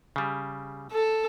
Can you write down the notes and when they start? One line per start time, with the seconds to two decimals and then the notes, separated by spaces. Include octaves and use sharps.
0.16 C#3 G3
0.91 A4